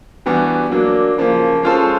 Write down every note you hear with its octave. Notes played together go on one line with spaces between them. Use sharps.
E3 G3 B3 D4 F#4
F#3 A#3 D4
C#3 F3 A#3
G#3 C#4 F4 A4 C5